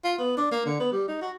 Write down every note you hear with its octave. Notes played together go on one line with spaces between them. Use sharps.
F4
B3
D4
A#3
D3
B3
G3
D#4
F#4